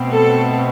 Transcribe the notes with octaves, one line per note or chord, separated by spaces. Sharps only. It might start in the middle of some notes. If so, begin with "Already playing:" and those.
Already playing: B2 A3 C4
A4